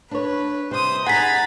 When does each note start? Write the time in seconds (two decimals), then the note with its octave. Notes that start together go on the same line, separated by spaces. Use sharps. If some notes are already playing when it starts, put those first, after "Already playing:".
0.11 D4 B4 C#5
0.71 C3 G3 C5 D#6
1.07 D#4 G#4 F#5 G#5 A#5 B5 A6 B6